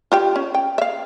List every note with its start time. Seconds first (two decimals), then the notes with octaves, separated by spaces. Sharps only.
0.12 F4 G4 G5
0.36 C#4
0.54 G5
0.78 E5 F5